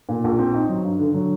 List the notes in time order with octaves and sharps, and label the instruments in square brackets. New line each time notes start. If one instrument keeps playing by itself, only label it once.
[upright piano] A#2
A#1
C4
D#4
F#3
G2
D3
F#3